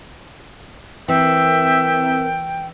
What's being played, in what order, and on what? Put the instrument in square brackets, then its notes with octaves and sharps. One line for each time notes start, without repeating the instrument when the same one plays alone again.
[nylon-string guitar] E3 [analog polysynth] C4 A#4 [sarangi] E5 [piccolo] G5